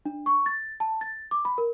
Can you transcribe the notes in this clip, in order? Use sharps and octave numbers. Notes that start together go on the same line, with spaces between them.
D4
C#6
A6
A5
A6
D6
B5
A#4